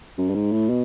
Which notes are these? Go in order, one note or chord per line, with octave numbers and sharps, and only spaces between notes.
F#2
G2
G#2
A2
B2